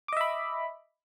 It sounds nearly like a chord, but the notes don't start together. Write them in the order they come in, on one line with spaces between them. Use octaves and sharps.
D6 D#5 E5 B5